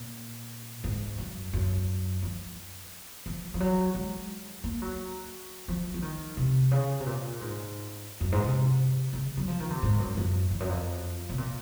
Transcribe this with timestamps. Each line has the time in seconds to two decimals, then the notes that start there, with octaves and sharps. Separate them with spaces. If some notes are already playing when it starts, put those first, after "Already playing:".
Already playing: A#2
0.84 G#2
1.18 F#2
1.53 F#2
2.23 F3
3.26 F3
3.54 F3
3.60 F#3
3.95 G#3
4.64 A#3
4.82 F#3
5.68 F3
5.94 F3
6.02 D#3
6.37 C3
6.71 C#3
7.00 C3
7.06 A#2
7.41 G#2
8.21 F#2
8.32 G#2
8.44 C3
9.13 C#3
9.37 F#3
9.48 F3
9.60 D#3
9.70 C3
9.82 G#2
9.99 F#2
10.17 F#2
10.51 F2
10.60 F#2
10.69 F2
11.29 C3
11.38 A#2